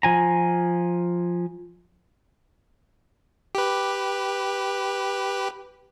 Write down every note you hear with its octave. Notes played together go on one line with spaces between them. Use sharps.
F3 G#5 A#5
G4 B4